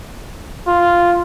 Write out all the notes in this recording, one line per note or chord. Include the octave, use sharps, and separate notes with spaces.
F4